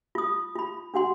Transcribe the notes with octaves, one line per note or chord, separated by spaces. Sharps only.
F4 D#6
F4 B5
D4 F#4 F#5 C6